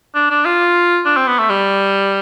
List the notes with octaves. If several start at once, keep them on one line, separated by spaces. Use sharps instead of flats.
D4
D4
F4
D4
C4
B3
A3
G3